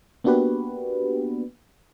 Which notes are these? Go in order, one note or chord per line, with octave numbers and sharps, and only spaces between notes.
A#3 B3 D4 F#4 G4 B4